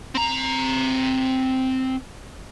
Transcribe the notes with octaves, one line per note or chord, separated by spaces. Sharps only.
C4 A#5